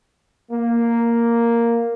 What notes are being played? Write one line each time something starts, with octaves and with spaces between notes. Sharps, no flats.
A#3